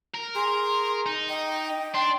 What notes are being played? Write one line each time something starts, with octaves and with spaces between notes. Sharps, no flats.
A#4
G#4 C6
D#4
D#5 G5
D4 C6